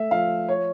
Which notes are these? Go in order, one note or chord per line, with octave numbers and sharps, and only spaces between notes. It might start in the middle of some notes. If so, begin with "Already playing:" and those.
Already playing: A3 E5
F3 F5
C#5